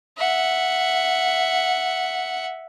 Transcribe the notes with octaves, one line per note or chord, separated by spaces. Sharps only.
E5 F#5